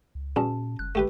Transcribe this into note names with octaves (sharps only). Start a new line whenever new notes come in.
C#2
E2 A#2 C#4 F#4 A5
F#1 F#6
A1 A3 G4 B4